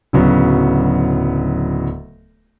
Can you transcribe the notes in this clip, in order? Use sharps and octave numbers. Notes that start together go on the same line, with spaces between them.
D1 C#3 F#3 B3